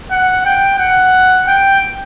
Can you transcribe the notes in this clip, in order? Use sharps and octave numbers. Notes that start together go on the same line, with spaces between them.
F#5
G5
F#5
G5